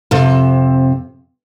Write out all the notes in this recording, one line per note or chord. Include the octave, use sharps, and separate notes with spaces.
F2 C3